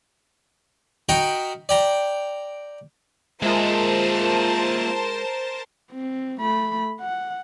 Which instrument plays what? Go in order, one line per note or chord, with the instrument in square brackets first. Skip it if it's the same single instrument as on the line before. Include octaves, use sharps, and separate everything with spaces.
[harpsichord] D#4 F#4 A#4 G5 A#5 B5
D5 G5 A#5
[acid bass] G#3 [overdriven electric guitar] A#3 E5 [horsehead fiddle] F4 [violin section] A#4 C5 A5
[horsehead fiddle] C4
A3 B5
F#5